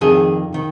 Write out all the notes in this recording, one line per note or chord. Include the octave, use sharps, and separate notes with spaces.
F2 D#3 G#4
D#3